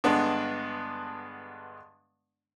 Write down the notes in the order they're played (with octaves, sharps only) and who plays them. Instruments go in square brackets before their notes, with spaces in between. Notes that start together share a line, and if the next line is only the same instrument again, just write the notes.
[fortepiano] G2 D3 G#3 B3 D4